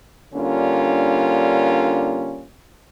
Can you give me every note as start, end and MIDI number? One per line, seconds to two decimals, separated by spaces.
0.34 2.46 50
0.34 2.46 55
0.34 2.46 58
0.34 2.46 61
0.34 2.46 62
0.34 2.46 65